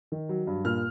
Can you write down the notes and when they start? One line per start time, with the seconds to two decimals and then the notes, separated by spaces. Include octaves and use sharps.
0.12 D#3
0.29 F#3
0.47 G2
0.65 A#2 F6